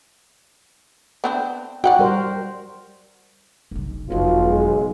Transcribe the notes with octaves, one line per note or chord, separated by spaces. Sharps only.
B3 C4 D4
F#4 D5 F#5 G5
G3 A#4 C5
F#1 B1
F#1 B1 F2 B2 F4
G#3